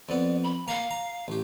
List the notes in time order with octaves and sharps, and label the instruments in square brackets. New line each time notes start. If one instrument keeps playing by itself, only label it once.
[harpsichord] F2 B3 [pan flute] D5
[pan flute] B5
[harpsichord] A#3 A#5 [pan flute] F5
[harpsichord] A#5
A1 G4